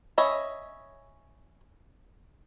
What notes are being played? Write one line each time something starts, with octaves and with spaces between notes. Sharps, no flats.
C#4 C#5 D#5 E5 B5